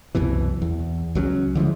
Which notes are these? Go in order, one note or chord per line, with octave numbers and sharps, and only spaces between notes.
C2 F#2 B2 E3
E2
C#2 F#3 G#3 C#4
D3 E3 F3 G#3